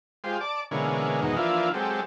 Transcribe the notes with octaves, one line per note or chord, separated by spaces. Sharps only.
G#3 F4 G4 C5
D5 A5 D6
B2 D3 E3 G#3 A#3 C#4
E2 G#2 B2 D#3 F#3 D#4
E3 F3 A#3 D4 E4 F4
F#3 G#3 C4 G4 A4